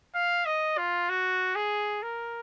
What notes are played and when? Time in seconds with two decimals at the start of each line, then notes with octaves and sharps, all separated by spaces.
0.15 F5
0.46 D#5
0.77 F4
1.09 F#4
1.55 G#4
2.03 A#4